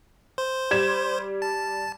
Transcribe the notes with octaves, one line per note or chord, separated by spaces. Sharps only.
C5
G3 G#6 E7
A5